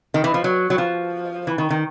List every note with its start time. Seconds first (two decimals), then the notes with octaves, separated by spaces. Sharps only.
0.14 D#3
0.24 E3
0.34 F3
0.44 F#3
0.70 F#3
0.78 F3
1.47 E3
1.58 D#3
1.70 D#3